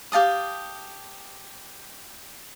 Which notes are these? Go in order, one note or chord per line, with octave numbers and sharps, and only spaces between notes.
G4 F5 A5 D#6